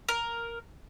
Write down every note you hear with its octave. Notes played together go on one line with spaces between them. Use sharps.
A#4